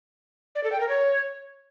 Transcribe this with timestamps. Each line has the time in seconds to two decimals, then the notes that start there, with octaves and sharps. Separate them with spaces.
0.55 D5
0.64 A4
0.72 G5
0.81 A#4
0.89 C#5